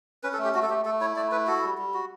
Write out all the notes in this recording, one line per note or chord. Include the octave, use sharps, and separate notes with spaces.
C#4 B4
A4
A3
G4
A3 F#4
A4
A3 G4
A3 A4
E4 C#5
A3 D5
E4 B4
F#4 A4
G3
G3
F#4